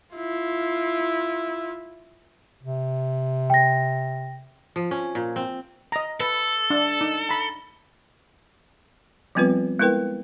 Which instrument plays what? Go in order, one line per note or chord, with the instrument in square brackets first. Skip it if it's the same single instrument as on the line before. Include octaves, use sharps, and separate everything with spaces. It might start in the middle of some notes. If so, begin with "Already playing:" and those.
[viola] E4 F4
[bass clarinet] C3
[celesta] G5 A#6
[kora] F3
C#4
A#2
C4
[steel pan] D#5 A#5
[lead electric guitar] A4 [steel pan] B4
[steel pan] D4
D#4
A#5 B5
[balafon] F3 G3 B3 C4 F4 B4
G#3 B3 E4 A#4 B4 G5